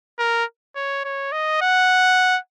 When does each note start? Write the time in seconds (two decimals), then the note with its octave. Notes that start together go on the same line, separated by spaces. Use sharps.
0.19 A#4
0.76 C#5
1.05 C#5
1.32 D#5
1.62 F#5